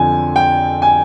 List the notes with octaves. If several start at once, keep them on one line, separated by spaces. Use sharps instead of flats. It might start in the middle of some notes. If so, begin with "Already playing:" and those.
Already playing: F2 D3 F3 G#5
G5
G#5